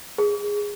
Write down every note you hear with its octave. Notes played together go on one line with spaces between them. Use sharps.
G#4